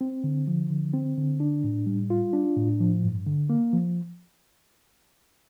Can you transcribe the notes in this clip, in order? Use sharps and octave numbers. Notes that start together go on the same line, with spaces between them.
C4
D3
F3
D3
C4
D3
D4
A2
G3
F4
D4
A2
F3
G2
D3
A#3
F3